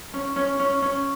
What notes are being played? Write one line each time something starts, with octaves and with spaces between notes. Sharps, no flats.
C#4
C#4
C#4
C#4